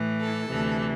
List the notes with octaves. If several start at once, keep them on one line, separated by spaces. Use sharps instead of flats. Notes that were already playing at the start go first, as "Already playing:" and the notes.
Already playing: A2 E3
A4
D2 C3 E3